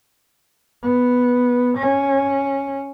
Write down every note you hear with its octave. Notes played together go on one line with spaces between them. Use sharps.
B3
C#4